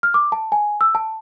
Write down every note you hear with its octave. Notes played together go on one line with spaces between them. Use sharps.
F6
D6
A5
G#5
E6
A5